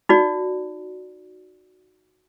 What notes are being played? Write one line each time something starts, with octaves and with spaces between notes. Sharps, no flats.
D#4 F#4 D5